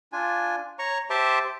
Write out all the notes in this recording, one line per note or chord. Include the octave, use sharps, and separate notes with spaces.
D4 F4 G#5
C#5 A#5 C#6
G4 C5 E5 A5 C6 D6